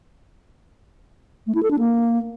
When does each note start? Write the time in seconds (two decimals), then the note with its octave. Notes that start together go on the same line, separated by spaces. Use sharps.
1.47 A3
1.55 E4
1.63 A4
1.71 D4
1.79 A#3